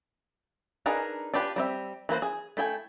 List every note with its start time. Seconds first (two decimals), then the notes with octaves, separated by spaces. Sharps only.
0.86 D4 D#4 G#4 A#4 B4
1.33 D4 F4 G4 B4 G5
1.56 G3 C4 E5
2.09 E3 A#3 B4 C5
2.22 G#4
2.57 A3 E4 G5 G#5